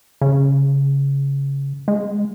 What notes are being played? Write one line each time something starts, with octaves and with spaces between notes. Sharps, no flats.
C#3
G#3